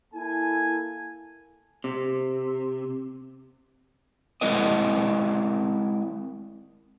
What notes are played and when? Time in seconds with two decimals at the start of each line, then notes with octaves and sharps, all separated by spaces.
0.14 A#3 E4 A4 G#5
1.84 C3
4.41 G#3 C4 E4 A#4 D5 D#5